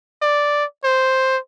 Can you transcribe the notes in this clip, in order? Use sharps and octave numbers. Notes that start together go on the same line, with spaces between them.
D5
C5